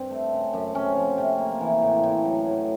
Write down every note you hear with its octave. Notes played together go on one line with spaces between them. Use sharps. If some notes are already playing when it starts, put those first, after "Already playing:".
Already playing: G2 C4
A3
C#3
F#2
C3 C#4
F3
C3
A#3
E3
A2
A2
F#3
A2